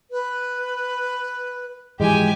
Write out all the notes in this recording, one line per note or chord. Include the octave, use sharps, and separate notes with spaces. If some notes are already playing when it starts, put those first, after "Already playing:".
B4
G#2 E3 F3 G#3 G4 G#5